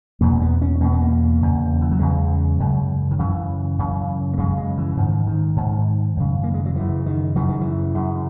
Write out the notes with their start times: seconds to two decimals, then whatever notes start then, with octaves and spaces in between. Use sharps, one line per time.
0.21 E2 B2 A#3
0.42 B3
0.62 C#4
0.80 E2 B2 A#3
0.92 B3
1.02 A#3
1.41 E2 C#3
1.81 E3
1.91 F#3
1.99 E2 C#3 G#3
2.60 F#2 C#3
3.11 D#3
3.19 F#2 C#3 E3
3.79 F#2 C#3
4.33 A#3
4.38 F#2 C#3 G#3
4.57 G#3
4.78 E3
4.97 G#2 D#3
5.27 D#3
5.56 G#2
6.17 F#2 C#3
6.43 A#3
6.54 G#3
6.66 F#3
6.75 F#2 C#3 E3
7.06 D#3
7.35 F#2 C#3 E3
7.49 D#3
7.61 E3
7.95 F#2 C#3